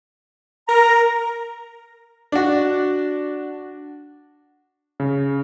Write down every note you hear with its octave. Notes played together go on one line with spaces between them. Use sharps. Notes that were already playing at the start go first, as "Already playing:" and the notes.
A#4 A#5
D4 F#4
C#3